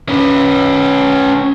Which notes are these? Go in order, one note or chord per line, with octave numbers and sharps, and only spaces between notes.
C#4 B4